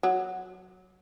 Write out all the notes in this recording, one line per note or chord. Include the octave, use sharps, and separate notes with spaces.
F#3